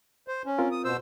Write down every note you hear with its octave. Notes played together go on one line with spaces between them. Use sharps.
C5
C#4
C4 F4 A#4
D#6
B2 C5 E6